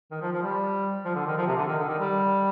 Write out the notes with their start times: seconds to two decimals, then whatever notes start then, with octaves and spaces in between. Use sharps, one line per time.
0.11 D#3
0.22 F3
0.33 F3
0.43 G3
1.05 F3
1.15 D3
1.27 D#3
1.37 F3
1.47 C3
1.57 D3
1.68 D#3
1.79 D3
1.89 D#3
1.99 G3